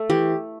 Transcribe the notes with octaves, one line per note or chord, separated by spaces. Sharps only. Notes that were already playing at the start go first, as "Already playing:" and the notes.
Already playing: A3
E3 G4